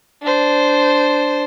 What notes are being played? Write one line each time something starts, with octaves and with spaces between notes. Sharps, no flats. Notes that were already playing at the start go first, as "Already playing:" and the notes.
D4 C5